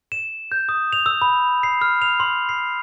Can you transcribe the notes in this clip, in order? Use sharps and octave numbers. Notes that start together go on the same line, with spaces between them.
E7
G6
D#6
F7
E6
B5
C7
F6
F7
C6
C7